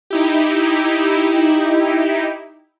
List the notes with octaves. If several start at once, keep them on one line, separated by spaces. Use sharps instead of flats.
D#4 E4 G4